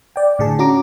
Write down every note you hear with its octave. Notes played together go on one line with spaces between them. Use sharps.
D5 G5
A2 D3 G#4 A5
C#4 F#4 A#5 D6